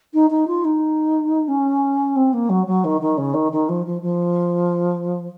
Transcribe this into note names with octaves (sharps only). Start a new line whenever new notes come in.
D#4
D#4
F4
D#4
C#4
C4
A#3
F#3
F#3
D#3
D#3
C#3
D#3
D#3
F3
F3
F3